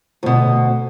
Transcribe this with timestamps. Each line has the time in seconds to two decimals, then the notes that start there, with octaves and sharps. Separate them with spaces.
0.23 D2 B2